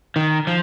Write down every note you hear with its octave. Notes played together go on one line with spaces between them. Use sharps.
D#3
F3